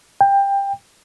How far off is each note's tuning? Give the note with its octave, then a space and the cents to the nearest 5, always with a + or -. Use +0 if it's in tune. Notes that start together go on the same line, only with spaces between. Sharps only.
G5 +20